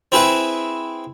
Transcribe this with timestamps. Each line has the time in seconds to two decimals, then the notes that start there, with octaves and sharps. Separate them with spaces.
0.12 C4 E4 G#4 B4 E5